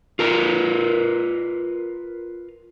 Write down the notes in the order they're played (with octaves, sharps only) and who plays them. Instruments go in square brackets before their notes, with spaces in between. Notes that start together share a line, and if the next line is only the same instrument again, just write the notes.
[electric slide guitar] F4 A#4 B4